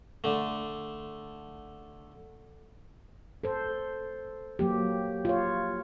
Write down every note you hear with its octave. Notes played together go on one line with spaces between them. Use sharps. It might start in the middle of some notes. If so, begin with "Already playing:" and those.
D3 A3
A4 C5
F#3 A#3 G4
F4 C#5